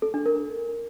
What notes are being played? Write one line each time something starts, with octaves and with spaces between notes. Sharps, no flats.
A4
D4
A#4